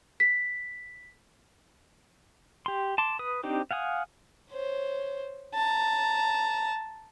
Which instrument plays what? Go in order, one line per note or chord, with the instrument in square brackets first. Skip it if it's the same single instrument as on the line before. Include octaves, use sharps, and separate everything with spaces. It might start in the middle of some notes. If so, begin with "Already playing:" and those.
[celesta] B6
[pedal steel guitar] G4 C6
A5 C6 D6
B4 D#6
C4 D4 D#4 G4 C5
F5 F#5 G#5 D#6
[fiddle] C5 C#5
A5 A#5